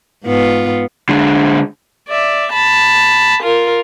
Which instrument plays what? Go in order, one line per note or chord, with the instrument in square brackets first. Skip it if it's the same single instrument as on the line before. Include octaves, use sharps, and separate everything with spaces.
[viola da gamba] G#2 B3 F4
[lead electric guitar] D3 G#3
[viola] D5 E5
A5 B5
F4 A#4